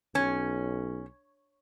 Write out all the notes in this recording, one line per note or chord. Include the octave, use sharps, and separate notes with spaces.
B1 C#4